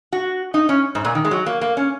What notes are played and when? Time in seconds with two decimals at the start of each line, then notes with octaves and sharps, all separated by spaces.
0.13 F#4
0.54 D#4
0.69 C#4
0.95 G#2
1.05 A#2
1.15 D#3
1.25 G#3
1.31 F#3
1.46 A#3
1.61 A#3
1.77 C#4